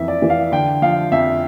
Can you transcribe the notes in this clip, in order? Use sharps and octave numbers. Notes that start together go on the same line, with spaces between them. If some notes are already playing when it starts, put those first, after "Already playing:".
Already playing: F2 E3 E5
D5
E3
F5
D3 G5
F3 F5
F2 E5